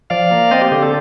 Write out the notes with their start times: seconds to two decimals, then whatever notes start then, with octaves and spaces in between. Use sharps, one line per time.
0.10 F3 D5 F5
0.31 A#3
0.51 C4 C5 D#5
0.61 G4
0.72 D3 G4
0.82 A4